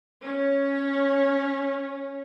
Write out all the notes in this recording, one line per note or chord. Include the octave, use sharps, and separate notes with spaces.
C#4 C#5